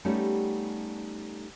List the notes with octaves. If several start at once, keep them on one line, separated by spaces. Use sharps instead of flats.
G3 A3 B3 C#4 D#4 G4